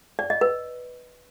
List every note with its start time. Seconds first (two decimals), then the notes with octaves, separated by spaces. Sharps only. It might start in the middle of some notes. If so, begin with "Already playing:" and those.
0.19 D5
0.30 D#5
0.41 B4